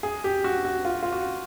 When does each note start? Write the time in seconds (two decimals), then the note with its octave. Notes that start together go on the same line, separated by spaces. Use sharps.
0.03 G#4
0.24 G4
0.44 F#4
0.65 F#4
0.85 F4
1.03 F4
1.12 F#4